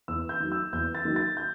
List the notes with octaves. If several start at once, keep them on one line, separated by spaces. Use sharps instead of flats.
E2 E6
G6
D#3 F#3
E6
E2 G6
A6
D#3 F#3
A6
G6